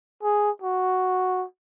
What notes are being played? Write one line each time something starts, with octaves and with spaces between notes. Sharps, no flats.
G#4
F#4